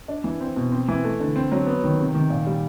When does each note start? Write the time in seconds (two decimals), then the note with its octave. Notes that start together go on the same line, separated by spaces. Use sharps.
0.08 D4
0.24 E3
0.40 C4
0.56 B2
0.72 C4
0.88 E3
1.04 A3
1.20 D3
1.36 C4
1.52 F#3
1.67 B3
1.84 D#3
1.98 C3
2.15 D#3
2.30 A#2
2.47 G3